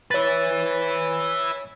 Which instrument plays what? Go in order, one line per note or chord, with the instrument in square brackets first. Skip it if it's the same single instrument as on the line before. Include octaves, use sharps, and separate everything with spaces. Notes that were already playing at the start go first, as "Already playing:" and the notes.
[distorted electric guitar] B4 E5 [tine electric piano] C#5 A6